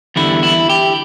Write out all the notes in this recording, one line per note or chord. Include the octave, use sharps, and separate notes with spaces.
E2 D3 G3 E4
E4
G4